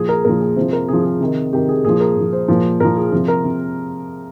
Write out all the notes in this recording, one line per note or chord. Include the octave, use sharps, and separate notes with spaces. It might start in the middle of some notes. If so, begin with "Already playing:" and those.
Already playing: A#2 F3 G#4
A#4
A#2 F3 A#4
G#4
C3 F3 C5
A#4
C3 F3 G#4
G#4
C3 D#3
C3 D#3 G4
G#4
A#2 F3 G#4
A#4
A#2 F3
C5
A#2 F3
A#2 F3 A#4
G#4
C3 F3
A#4
C3